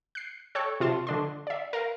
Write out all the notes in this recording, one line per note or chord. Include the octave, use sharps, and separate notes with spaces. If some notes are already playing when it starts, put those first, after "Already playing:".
F#6 C7
A4 C#5 G5 C#6 F#6
C3 F4 A5 C6
D3 D4 C6
D5 E5
A#4 F5